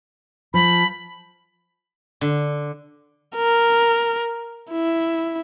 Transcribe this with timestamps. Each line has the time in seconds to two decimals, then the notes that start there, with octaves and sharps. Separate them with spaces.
0.54 F3 B5
2.21 D3
3.36 A#4
4.72 E4